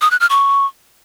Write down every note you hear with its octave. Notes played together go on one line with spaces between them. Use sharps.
D#6
F#6
F6
C#6